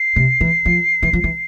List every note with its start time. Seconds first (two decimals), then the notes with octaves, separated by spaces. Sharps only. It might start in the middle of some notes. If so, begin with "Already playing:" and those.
Already playing: C7
0.16 C3
0.41 E3
0.65 F3
1.03 E3
1.13 F3
1.24 E3